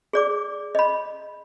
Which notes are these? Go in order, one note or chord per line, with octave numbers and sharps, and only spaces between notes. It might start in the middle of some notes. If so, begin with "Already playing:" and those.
G#4 D5 D6
D#5 B5